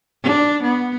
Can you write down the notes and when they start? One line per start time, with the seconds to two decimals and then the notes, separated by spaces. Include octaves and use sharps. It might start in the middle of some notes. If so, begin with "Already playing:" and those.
0.23 D4
0.63 B3